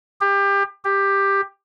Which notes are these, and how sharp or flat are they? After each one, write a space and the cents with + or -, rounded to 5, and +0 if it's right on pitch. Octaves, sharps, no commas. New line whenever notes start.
G4 +25
G4 +10